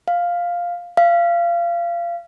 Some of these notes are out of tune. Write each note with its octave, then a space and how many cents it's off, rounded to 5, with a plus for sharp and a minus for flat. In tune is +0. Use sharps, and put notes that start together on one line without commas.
F5 +0
F5 -25